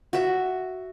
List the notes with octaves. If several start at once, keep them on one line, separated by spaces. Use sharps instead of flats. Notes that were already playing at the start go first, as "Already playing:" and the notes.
F#4 E5